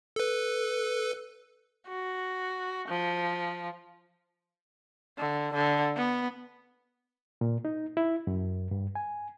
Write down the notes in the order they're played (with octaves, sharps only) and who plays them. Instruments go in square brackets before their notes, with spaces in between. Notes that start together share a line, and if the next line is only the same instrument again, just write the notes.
[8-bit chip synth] A4 B4
[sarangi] F#4
F3
D3
D3
B3
[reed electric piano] A#2
D#4
E4
F#2
G2
G#5